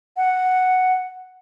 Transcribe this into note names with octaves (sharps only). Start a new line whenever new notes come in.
F#5